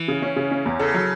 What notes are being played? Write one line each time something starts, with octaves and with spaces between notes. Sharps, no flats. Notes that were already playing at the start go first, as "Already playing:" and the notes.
Already playing: E3
C#3
C#4
C#3
C#4
E2
C#3 A4
F#3